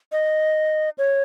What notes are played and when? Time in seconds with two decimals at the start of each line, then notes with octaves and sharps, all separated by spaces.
0.12 D#5
0.98 C#5